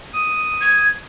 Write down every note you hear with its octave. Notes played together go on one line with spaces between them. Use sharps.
D#6
G#6